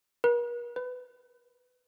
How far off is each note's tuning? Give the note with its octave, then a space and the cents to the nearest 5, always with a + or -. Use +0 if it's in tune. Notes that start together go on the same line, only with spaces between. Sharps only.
A#4 +45
B4 +20